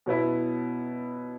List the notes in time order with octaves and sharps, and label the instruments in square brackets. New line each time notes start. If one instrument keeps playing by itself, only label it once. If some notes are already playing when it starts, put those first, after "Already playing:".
[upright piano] B2 F#3 B3 E4